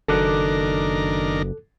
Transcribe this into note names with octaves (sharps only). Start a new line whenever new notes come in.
F#1 D#3 D4 A4 A#4 D6 F#6